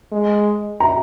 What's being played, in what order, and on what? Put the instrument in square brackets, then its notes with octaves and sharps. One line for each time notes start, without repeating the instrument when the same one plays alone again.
[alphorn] G#3
[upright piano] A#5